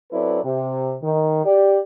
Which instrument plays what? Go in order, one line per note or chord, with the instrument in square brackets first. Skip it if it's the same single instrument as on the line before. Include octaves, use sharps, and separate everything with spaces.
[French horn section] F#3 C4 E4 A4 B4 D5
C3
D#3
G4 D5